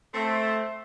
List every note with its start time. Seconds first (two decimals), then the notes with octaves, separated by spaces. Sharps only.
0.14 A3 C4